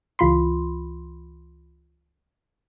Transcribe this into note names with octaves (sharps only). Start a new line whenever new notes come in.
C#2 E3 F4 B5 C6